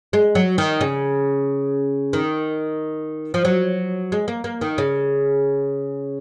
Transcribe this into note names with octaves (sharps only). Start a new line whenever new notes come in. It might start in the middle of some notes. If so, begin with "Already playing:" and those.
G#3
F#3
D#3
C#3
D#3
F3
F#3
G#3
A#3
A#3
D#3
C#3